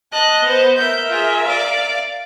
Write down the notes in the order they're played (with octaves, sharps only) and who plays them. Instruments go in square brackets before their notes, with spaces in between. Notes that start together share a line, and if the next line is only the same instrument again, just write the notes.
[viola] D#5 [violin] A5 F#6
[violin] B3 C5
[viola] A#4 E5 [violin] G6
[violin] F4 G#4
D5 F5